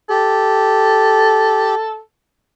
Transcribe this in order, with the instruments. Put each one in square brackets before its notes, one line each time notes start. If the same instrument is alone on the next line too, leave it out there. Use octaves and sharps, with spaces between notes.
[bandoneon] G4 [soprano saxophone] A4